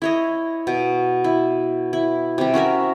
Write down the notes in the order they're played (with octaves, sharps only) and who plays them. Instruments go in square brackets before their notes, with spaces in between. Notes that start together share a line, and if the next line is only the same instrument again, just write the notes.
[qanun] E4 C#5 D#5
B2
E4
E4
C3 G3
C#4 F#4 A#4 E5